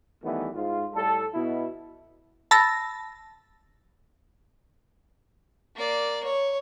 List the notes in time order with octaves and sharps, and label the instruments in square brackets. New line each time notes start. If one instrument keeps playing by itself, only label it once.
[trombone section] D#3 E3 G3 A3 B3
G#2 F4
A2 G3 A4
B2 E4
[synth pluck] A5 B5 E6 A6 A#6
[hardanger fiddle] A#3 D5
C#5